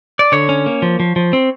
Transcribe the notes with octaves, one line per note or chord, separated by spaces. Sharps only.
D5
D3 C#5
C#4
A#3
F3
F3
F3
C4